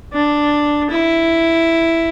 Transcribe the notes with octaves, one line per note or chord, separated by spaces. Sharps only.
D4
E4